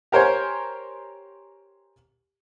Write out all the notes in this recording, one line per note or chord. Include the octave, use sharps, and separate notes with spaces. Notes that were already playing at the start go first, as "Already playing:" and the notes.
G4 A#4 C5 C#5 G#5